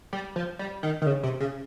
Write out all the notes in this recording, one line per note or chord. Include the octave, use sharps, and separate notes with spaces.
G3
F3
G3
D#3
D#3
C#3
C3
C#3